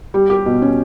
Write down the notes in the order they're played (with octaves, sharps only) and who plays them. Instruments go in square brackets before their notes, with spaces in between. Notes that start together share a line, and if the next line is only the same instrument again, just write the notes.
[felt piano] G3
G4
B2
C#4